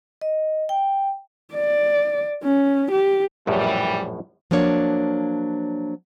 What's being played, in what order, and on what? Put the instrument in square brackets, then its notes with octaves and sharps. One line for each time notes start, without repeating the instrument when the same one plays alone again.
[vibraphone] D#5
G5
[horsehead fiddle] D5
C#4
G4
[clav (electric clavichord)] A#1 F#2 A2 [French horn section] E3 G3
[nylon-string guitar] F3 F#3 A#3 D4 C#5